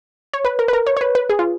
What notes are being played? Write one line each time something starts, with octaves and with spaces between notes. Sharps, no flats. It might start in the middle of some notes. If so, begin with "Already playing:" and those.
C#5
B4
A#4
B4
A#4
C#5
C#5
B4
B4
G#4
F4